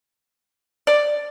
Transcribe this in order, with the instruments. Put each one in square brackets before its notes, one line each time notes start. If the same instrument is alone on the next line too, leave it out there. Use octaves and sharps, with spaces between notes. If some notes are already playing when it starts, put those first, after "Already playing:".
[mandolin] D5